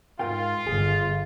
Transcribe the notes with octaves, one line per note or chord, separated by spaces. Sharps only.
G#2 F4 A#4 G5
G1 G#4